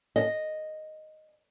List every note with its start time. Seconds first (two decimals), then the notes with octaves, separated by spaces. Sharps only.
0.16 D#5